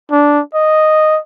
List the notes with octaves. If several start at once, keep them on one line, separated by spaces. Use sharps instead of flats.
D4
D#5